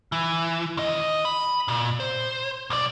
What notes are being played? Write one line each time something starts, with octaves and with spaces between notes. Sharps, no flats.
E3
D#2 D#5
B5
A#2
C5
B1 D5